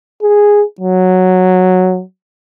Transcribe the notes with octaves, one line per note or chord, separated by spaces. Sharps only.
G#4
F#3